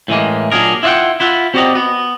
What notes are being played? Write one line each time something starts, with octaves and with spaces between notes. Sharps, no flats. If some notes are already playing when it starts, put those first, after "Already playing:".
A2 E3 G#3 A#3
A#2 F#3 D4 G#4 A#4
E4 F4 D5 F#5 G5
E4 F4 F#5
C4 F#4 G4 D5 D#5 A#5
B3